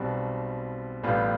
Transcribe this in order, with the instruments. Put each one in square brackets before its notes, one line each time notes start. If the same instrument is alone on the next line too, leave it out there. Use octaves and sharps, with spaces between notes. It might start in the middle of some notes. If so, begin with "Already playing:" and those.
Already playing: [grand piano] B1 B2 G3 C4
A1 A2 G3 B3 F4